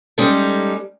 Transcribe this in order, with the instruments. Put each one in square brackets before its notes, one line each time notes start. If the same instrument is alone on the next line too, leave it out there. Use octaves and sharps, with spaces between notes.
[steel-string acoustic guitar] G3 G#3 C#4 D#4 A4